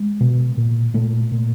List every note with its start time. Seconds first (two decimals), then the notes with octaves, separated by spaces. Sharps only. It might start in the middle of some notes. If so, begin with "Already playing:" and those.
Already playing: G#3
0.21 B2
0.57 A#2
0.94 A#2 A3
1.32 A#2